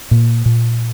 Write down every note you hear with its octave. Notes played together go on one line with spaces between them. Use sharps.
A#2
A#2